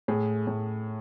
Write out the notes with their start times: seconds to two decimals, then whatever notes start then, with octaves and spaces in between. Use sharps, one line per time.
0.08 A2 G#4
0.47 A2